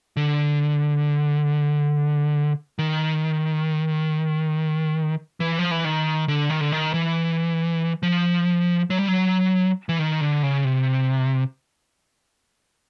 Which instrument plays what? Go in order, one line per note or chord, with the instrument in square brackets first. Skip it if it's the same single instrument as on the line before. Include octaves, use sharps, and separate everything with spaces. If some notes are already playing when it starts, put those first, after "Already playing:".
[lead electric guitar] D3
D#3
E3
F3
E3
D#3
D3
D#3
D3
D#3
E3
F3
F#3
G3
F#3
E3
D#3
D3
C#3
C3